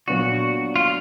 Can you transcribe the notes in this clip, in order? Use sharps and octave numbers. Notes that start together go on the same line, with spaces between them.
A#2 F#3 B3 D4 F#4
F4